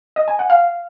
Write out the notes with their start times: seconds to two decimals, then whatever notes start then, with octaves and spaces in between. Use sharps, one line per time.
0.16 D#5
0.28 G#5
0.39 F#5
0.50 F5